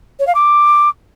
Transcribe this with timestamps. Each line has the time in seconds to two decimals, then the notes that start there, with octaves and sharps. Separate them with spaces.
0.19 C#5
0.27 F5
0.35 D6